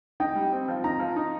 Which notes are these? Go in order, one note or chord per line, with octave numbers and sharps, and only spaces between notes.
D#4 G5
G3
C4
F3
D#4 A#5
F3
D#4